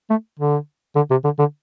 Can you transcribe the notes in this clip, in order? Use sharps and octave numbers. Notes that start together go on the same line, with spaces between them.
A3
D3
D3
C3
D3
D3